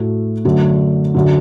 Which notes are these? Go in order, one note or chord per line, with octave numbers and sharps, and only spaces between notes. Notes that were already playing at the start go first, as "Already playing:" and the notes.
Already playing: A2 A3 F#4
F#2 D3 A3 D4 F#4
F#2 D3 F#3